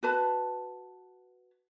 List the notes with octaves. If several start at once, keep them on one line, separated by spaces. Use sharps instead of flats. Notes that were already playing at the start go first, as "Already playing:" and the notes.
F#4 B4 A5